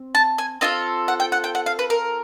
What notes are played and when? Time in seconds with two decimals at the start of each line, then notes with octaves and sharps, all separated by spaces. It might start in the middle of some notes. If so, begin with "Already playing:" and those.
Already playing: C4
0.15 A5
0.38 G#5
0.61 C4 F4 A4 D#5
1.08 F#5
1.20 G5
1.32 F#5
1.44 G5
1.55 F#5
1.66 F5
1.79 B4
1.90 A#4